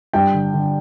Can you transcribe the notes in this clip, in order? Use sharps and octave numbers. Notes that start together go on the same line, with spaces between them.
G2 G5
D3
D3